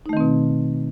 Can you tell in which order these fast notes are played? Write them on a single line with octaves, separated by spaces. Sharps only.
D#4 A3 D#3 C4 B2